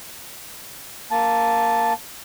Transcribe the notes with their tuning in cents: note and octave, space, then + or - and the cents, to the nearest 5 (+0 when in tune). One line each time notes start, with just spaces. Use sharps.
A#3 +0 A5 +0